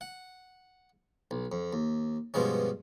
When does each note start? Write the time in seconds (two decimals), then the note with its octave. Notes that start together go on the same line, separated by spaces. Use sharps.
0.01 F#5
1.31 B1
1.52 F2
1.73 D#2
2.34 G2 B2 F3 G#3 C#4